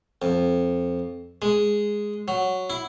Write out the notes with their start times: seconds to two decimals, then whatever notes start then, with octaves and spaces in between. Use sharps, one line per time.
0.22 F2
1.42 G#3
2.28 F#3
2.70 E4